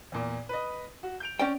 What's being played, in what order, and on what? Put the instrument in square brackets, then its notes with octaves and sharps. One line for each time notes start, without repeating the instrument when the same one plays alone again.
[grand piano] E2 A#2
B4 D#5
F#4
G6 D7 F7
[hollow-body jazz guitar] C#4 D5 G5